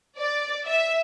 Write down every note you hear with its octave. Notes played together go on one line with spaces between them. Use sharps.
D5
E5